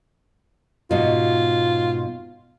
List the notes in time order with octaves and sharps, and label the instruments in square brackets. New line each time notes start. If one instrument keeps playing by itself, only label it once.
[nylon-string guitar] G#2 B2 [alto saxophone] F4